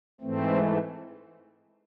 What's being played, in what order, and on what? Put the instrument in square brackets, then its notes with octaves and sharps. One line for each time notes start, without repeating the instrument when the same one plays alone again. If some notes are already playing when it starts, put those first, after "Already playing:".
[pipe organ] G#2 E3 A3 C4